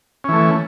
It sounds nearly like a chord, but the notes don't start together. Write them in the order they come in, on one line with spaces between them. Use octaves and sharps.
C#4 E3 A3